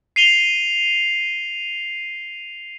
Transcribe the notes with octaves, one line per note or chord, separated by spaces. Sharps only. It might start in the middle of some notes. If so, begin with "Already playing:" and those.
C7 D#7 F7 G7